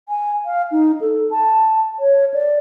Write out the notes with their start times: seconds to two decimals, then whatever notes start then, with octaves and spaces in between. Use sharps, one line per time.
0.09 G#5
0.45 F5
0.72 D#4
1.01 A4
1.30 A5
1.99 C#5
2.34 D5